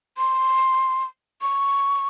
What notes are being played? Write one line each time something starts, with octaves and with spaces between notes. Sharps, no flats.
C6
C#6